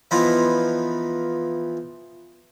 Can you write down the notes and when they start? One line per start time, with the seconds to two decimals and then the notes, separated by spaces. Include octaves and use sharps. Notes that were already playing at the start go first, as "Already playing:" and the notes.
0.11 E3 F3 B3 D#4 F4